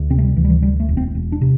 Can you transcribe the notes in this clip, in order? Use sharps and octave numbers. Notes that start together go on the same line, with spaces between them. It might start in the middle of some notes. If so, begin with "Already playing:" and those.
Already playing: D2
C3 C4
A3
G3
D2 E3
G3
E3
D2 G3
A3
E1
C4
E1
D4
C3